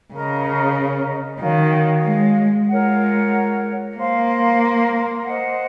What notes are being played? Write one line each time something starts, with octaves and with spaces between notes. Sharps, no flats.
C#3 A#4 D#5 A#5
D#3 F#4 C#5 F5
G#3
G#3 F4 A#4 C#5 F#5
A#3 C5 F5 C6
C5 D#5 F#5